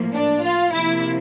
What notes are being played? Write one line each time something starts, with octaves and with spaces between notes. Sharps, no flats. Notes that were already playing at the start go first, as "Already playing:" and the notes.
Already playing: A2 F3 A#3
D4
F4
C3 F3 A#3 E4